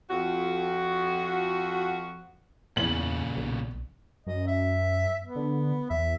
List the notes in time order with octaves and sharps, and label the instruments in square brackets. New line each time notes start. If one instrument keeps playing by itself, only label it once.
[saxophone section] F2 F#4
[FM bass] E2 [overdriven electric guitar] A#2 C#3 [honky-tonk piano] F#7
[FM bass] B1
[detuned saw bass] F#2 [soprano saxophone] D#5
[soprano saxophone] E5
B3
[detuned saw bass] D3
[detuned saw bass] E2 [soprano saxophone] E5